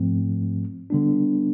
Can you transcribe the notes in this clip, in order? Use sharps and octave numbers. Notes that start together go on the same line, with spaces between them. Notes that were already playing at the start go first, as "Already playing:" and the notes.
Already playing: G#2 F3 A3 C4
D3 G3 B3 D4